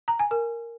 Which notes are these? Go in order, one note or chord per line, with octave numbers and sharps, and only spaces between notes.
A#5
G#5
A#4